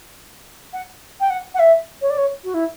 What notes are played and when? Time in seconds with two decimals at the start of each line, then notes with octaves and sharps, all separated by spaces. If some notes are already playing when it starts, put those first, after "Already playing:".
0.73 F#5
1.20 G5
1.30 F#5
1.54 F#5
1.59 E5
2.01 C#5
2.10 D5
2.17 C#5
2.44 F#4
2.54 E4